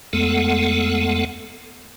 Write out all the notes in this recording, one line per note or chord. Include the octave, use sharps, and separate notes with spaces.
F2 G#3 A3 B3 A4 F#5